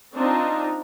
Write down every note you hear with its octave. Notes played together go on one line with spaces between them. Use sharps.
C4 D4 D#4 F4